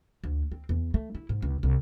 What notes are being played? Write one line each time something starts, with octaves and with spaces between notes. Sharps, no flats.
D2
C4
E2
A3
E4
G#2
C#2
C2